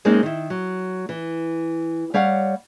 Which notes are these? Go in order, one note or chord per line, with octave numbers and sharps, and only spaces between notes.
F#2 G#3 A#3 C4 C#4 D#4
D#3 E4
F#3
E3
G3 C#5 F5 F#5